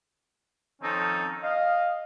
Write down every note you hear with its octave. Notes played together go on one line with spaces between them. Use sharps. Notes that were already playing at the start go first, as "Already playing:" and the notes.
D#3 F3 C4 C#4 D#4 A4
D#5 F5